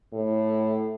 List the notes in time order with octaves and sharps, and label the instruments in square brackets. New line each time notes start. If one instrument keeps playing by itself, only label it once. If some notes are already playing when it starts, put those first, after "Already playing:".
[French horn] A2